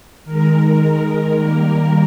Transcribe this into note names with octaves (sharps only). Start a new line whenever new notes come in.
D#3 G#3 A#4
D#3 G3 A#3